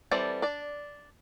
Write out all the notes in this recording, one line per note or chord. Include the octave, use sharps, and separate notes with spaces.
E3 G3 C4 A4 D5
D4 D5